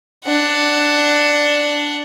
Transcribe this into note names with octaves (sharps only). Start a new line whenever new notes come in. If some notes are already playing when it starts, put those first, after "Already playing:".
D4 F#5